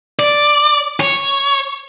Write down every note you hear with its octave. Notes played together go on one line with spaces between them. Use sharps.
D5
C#5